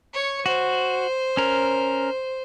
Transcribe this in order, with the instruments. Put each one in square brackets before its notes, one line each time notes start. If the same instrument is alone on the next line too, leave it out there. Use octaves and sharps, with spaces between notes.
[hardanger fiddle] C#5 C#6
[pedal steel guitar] F#4 [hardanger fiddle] C5
[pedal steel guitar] C#4 A#4